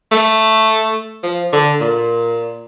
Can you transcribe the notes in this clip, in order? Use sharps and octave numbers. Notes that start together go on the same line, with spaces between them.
A3
F3
D3
A#2